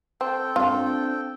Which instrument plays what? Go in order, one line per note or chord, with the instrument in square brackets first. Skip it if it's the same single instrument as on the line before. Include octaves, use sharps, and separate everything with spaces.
[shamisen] C4 [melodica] A4 G5
[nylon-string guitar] C4 D4 [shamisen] F4